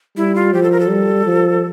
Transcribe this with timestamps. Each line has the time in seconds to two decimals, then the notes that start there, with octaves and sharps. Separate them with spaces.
0.17 G3 E4
0.35 F4
0.53 F3 G4
0.63 A4
0.72 A#4
0.80 A4
0.90 G3
1.26 F3